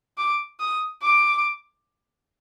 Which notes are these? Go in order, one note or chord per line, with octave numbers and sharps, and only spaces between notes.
D6
D#6
D6